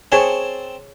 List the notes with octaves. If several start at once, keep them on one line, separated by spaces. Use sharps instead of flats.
C4 G#4 C#5 G#5 A5